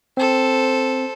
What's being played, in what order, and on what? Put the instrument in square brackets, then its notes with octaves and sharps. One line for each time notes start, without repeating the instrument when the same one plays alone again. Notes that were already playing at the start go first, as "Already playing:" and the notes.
[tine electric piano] C4 [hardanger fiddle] A4 C5